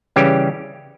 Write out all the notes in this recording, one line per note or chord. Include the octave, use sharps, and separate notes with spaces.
C#3 E3 G3 C#4 G4